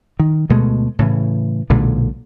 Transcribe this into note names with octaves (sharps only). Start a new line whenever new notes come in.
D#3
D2 B2 G#3 A3
A2 C#3 E3
B1 A#2 D3 G#3